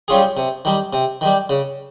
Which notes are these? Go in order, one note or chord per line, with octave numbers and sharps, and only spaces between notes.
G3 C#4 F4 G#4
C3
D#3 G3
C3
D#3 G3
C#3